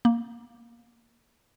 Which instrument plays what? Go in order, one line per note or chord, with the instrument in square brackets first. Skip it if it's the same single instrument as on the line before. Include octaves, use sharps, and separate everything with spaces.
[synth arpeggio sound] A#3